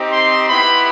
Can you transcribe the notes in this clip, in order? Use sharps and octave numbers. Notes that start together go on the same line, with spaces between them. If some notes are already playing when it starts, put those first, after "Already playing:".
Already playing: C4 D#4 G4
C6
B3 E4 G4 B5